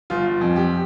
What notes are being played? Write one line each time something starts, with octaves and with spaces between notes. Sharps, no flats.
G1 F4
F2
G4